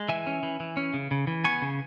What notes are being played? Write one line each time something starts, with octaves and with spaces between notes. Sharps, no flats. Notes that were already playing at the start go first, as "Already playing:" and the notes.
Already playing: G#3
E3 E5 G#5
C#4
E3
E3
C#4
C#3
C#3
E3
B3 G#5 C#6
C#3